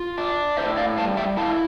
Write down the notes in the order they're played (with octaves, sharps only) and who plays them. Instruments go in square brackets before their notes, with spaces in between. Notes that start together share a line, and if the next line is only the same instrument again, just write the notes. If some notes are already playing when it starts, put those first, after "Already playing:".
Already playing: [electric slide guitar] F4
D4
A2 C5 E5
D5 F5
G3 F5 A5
E5 G5
E4 F5 A5